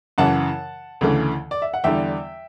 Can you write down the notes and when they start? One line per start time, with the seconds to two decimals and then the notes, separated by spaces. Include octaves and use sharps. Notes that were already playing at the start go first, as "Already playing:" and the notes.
0.18 F#2 C#3 E3 F#5 A5
1.01 D2 C#3 E3 A3
1.51 D5
1.62 E5
1.74 F#5
1.84 E2 D3 G3 E5 G5